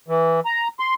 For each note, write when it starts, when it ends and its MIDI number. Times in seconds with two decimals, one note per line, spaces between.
0.08 0.40 52
0.45 0.68 82
0.80 0.94 84